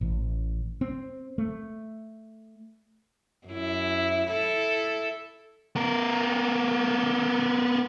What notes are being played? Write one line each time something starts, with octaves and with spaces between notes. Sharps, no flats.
A1
C4
A3
F#2 E4
E4 A4
B3 A#4